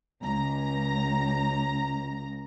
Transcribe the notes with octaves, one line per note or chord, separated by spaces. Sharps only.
C#2 A#5